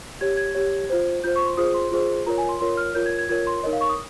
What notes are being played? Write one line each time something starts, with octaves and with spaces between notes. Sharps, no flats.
G4 C#5 G#6
G#6
G4 C#5
F4 C5
F4 C5 G6
C#6
C6
F4 G#4 C5 D#6
C6
F4 G#4 C5
F4 A#4 C#5 A#5
G#5
C6
F4 A#4 C#5 C6
F6
F4 A#4 C#5 G6
G#6
G#6
F4 A#4 C#5 G#6
C6
D#4 A#4 C#5 D#5
F5
C#6
D#6